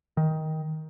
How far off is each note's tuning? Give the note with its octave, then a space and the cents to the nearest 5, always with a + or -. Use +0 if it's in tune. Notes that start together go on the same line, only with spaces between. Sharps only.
D#3 +15